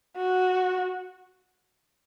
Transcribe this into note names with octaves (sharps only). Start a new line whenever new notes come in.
F#4